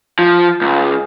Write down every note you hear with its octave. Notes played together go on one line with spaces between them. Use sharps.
F3
C#2